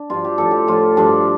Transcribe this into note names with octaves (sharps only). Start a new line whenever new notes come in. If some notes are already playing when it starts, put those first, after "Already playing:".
Already playing: D4
G2 F3 F4
G4
A2 F3 A4
G4
A2 F3 F4
G2 F3 D4